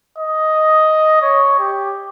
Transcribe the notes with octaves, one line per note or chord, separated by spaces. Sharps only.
D#5
C#5
G4